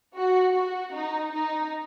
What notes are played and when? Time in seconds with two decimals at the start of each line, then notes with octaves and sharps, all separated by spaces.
0.15 F#4
0.55 F#4
0.93 D#4
1.32 D#4